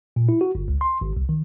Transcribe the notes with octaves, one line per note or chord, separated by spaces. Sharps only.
A#2
E4
F#4
G1
C#2
C6
G#1
C2
D#3